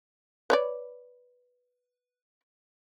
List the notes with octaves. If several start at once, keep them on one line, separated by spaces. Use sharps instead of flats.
B4 C#5 D5